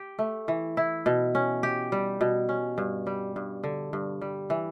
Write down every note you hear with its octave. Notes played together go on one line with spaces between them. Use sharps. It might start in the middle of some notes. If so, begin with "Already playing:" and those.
Already playing: G4
A3
E3
E4
B2
C#4
G4
G3
B2
C#4
G2
G3
G2
D3
G2
G3
E3